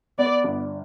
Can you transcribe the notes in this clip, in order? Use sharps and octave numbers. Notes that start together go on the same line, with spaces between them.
B3 D5
G1